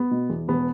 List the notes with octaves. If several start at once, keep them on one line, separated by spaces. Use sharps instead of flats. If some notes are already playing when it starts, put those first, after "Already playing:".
Already playing: B3
B2
E2
E1 B3